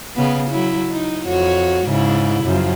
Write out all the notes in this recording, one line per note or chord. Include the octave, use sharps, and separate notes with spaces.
C#3 B3
F#3 E4
D#4
F2 F#4 C#5
G#2 C#3 E4
F#2 C#3 F3